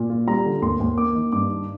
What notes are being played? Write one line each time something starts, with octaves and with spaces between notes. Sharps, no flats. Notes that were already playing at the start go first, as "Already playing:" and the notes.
Already playing: A#2
F4
G3 A#5
D3
D#2 C6
D#2
A#3 D6
D#3
G2 D6
D#4